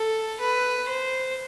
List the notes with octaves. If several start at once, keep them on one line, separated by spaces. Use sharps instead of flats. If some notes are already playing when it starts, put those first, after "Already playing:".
Already playing: A4
B4
C5